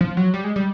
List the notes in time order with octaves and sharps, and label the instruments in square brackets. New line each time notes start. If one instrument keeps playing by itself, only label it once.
[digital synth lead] F3
F#3
G3
G#3
G3